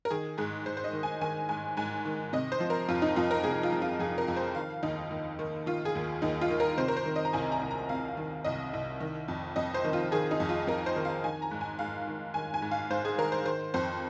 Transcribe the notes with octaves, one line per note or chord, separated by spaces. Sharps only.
A#4
D#3 G#4
G#2 G#4
G#2 C5
C5
D#5
D#3
G#5
D#3 G#5
G#2 G#5
G#2 G#5
D#3
C3 D#5
C5
F3
A#4
F2 F4
D#4
F2 F4
A#4
C3 G#4
F4
F3
F4
F2 G#4
A#4
F2
C5
D#3 F5
D#2 D#4
D#2
D#3
D#3 F4
G#4
D#2
D#2 D#4
F4
D#3
A#4
C3 C5
A#4
C5
D#3
D#5
A#5
C2 G#5
A#5
C2
A#5
C3 F5
D#3
C2 D#5
C2
D#3
F2
F2 D#5
C5
D#3
F4
D#3 G#4
D#4
F2
F4
F2 A#4
C5
D#3
F5
D#3 G#5
A#5
G#2
G#5
G#2 F5
D#3
D#3 G#5
G#5
G#2
F5
G#2 C5
G#4
D#3 A#4
C5
D#3 C5
F2 C5